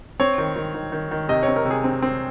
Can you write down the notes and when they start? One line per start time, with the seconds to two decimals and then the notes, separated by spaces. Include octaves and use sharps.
0.20 C4 C#5
0.38 D#3
0.56 D#3
0.74 D#3
0.92 D#3
1.11 D#3
1.29 C3 D#5
1.43 C4 C#5
1.56 A#4
1.65 C3
1.71 G#4
1.84 C4
2.02 C4